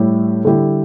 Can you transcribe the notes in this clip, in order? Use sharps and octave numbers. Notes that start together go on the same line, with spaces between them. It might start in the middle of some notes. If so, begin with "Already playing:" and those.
Already playing: A2 G3 E4 G4
D3 G3 E4 G4